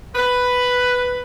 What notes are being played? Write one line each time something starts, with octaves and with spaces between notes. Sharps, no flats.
B4